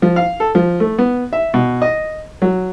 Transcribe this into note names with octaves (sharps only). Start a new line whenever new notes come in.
F3
F5
A4
F3
A3
B3
E5
B2
D#5
F#3